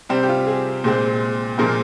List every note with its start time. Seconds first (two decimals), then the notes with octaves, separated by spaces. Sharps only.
0.09 C3 G3 C4
0.23 G4
0.28 F4
0.47 G#4
0.84 A#2 G#3 C4
1.58 A#2 F3 G#3 C4 A#4